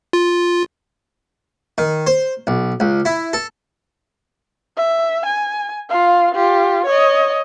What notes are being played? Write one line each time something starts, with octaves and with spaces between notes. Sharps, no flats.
F4
D#3
C5
B1
C#2
E4
A4
E5
G#5
F4 F5
F4 G4
C#5 D#5